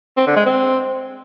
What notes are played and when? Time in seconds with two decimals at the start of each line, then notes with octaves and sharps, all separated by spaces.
0.17 C4
0.27 D3
0.36 G#3
0.46 C4